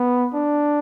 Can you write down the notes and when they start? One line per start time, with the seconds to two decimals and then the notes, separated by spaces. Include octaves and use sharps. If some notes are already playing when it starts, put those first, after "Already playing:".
Already playing: B3
0.34 D4